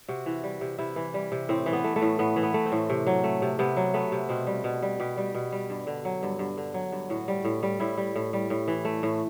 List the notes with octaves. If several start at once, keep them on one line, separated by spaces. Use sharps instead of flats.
C3 F#4
E3
G3
C3
C3 E4
E3
G3
C3
A2 C4
E3
B3
A3
A3
A2
A2 B3
E3
B3
A3
C4
A2
C3
F#3
A3
C3
C3 B3
F#3
A3 B3
C3
B2 C4
G3
B2
G3
B2 G4
G3
B2
G3
G2
D3
F#3
G2
G2
D3
F#3
G2
A2 F#4
G3
A2
G3
A2 E4
G3
A2
G3
A2
E3
A3
A2